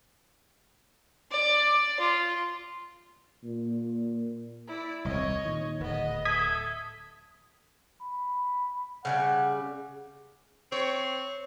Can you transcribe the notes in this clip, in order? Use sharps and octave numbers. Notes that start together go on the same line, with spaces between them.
D5
F4
A#2
E4 D5
D#1 C2 C#5 D#5
A#2 D#3
D1 B3 D#5
A4 E5 D#6 G#6 B6
B5
C#3 F3 G3 F#5
C4 C#5